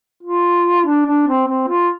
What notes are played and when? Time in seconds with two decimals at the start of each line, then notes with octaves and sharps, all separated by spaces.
0.23 F4
0.85 D4
1.06 D4
1.27 C4
1.47 C4
1.68 F4